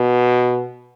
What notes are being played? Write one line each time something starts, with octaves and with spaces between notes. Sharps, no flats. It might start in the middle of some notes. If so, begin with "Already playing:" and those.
Already playing: B2